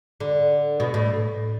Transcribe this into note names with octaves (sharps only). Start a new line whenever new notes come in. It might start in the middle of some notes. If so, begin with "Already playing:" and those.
D3
B2
A2